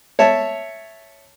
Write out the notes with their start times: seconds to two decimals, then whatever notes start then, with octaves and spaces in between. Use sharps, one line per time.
0.19 C#5 E5 A5